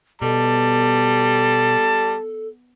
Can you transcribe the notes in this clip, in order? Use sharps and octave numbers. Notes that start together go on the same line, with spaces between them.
B2 G3 A4 A5